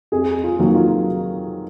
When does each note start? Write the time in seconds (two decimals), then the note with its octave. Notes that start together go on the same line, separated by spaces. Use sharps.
0.12 F2 G#4
0.44 F4
0.59 D#3 F#3 A#3
0.75 F4